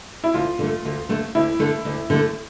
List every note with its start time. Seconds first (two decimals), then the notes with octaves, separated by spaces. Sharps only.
0.24 E4
0.34 D2 F4
0.59 D3 A3
0.85 D2
1.09 D3 A3
1.35 D2 E4
1.59 D3 A3
1.85 D2
2.10 D3 A3